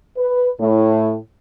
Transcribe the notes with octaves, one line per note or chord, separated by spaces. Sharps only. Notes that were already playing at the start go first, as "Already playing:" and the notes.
B4
A2